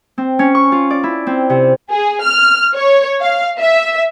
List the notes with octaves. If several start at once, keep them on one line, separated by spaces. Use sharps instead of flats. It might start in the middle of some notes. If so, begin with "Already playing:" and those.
C4
C#4
C#6
F4
D5
E4
C4
C3
G#4
F6
C#5
F5
E5